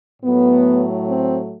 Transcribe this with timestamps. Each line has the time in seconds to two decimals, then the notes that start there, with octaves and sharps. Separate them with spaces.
0.23 A2 F#3 A3 B3
1.08 C4